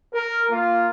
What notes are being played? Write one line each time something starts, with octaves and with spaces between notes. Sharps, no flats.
A#4
A#3 F4